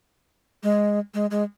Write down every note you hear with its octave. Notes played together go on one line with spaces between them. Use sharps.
G#3
G#3
G#3